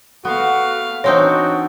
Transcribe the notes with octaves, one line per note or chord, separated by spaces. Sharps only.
A3 B3 F#4 F5
E3 C4 D4 D#4 F#4 C#5